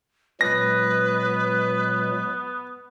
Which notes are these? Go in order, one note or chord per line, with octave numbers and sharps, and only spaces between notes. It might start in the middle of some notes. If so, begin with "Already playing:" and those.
A#2 F#3 G#3 B3 B4 A#6